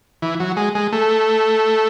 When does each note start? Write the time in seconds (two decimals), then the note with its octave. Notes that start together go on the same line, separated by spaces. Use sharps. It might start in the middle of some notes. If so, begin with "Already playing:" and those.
0.22 E3
0.40 F#3
0.57 G#3
0.75 G#3
0.93 A3